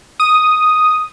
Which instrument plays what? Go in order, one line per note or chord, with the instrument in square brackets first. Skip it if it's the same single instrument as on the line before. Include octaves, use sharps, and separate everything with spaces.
[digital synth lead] D#6